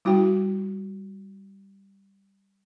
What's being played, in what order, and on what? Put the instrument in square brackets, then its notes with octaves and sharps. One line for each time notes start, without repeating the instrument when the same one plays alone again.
[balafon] G3 E4 F#4 G5